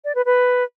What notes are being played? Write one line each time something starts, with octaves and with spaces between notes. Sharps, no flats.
D5
B4
B4